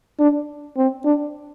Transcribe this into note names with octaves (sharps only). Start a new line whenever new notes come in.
D4
C4
D4